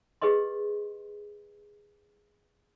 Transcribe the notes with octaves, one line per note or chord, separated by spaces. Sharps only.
G4 G#4 B4 D#5 C6